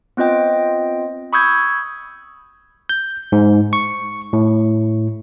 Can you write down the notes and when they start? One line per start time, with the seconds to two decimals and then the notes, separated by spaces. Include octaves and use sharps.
0.17 B3 C4 F4 D#5 G5
1.33 B5 C#6 D#6 E6 G6 G#6
2.89 G6
3.32 G#2
3.73 C#6
4.33 A2